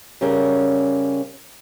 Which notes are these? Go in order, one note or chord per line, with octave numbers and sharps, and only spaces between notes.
C#3 G3 C#4 A#4